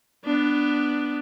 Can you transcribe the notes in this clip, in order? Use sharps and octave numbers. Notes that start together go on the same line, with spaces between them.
B3 D4